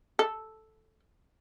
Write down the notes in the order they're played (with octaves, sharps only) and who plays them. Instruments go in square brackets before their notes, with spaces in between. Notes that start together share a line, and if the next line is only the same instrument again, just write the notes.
[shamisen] A4